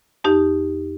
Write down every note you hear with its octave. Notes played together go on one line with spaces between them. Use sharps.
F2 D#4 G4